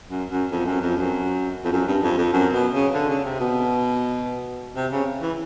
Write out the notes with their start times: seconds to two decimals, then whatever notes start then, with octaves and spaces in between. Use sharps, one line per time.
0.10 F#2
0.30 F#2
0.51 F2
0.66 F#2
0.81 F2
0.97 F#2
1.64 F2
1.72 F#2
1.87 G2
2.03 F2
2.18 F2
2.33 F#2
2.53 B2
2.74 C#3
2.94 D3
3.09 C#3
3.25 C3
3.40 B2
4.76 C3
4.92 C#3
5.22 E3